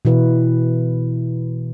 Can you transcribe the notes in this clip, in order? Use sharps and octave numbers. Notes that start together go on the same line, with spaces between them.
B2 E3 E4 B4